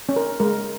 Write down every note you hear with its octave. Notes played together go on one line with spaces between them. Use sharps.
C#4
A#4
G#3 A#4